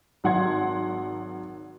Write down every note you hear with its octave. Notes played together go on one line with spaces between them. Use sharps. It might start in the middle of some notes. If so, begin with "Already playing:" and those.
G#1 F#3 F#5 C6 G#6